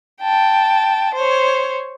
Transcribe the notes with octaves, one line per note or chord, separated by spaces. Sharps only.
G5 A5
C5 C#5